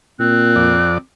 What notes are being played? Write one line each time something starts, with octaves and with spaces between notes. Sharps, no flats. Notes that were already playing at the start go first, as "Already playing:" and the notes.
A#2 C4 F#6
F2 D5